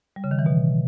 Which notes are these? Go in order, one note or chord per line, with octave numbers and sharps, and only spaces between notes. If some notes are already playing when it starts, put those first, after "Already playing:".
G3
C#3
D#3
E3
B2